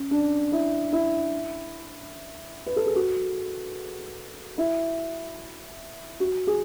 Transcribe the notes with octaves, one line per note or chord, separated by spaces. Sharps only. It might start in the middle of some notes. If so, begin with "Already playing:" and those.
Already playing: C#4
D4
E4
E4
B4
A4
G#4
F#4
E4
F#4
G#4